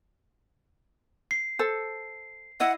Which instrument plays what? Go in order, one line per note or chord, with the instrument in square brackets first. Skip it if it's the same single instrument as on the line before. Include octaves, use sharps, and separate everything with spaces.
[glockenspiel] C7
[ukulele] A4 C5
[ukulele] E4 D#5 [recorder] F#5